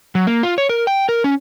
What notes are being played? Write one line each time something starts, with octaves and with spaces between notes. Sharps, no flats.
F#3
A#3
F4
C#5
A#4
G5
A#4
C#4